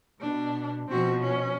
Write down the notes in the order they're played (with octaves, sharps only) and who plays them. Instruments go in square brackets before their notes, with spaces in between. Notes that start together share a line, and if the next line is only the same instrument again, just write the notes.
[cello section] B2 [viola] D4
[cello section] B2 F3 [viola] C4 F#4
[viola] C#4